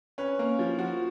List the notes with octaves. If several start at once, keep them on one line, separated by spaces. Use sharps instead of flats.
C#4 B4
A#3
F3
F3 F#4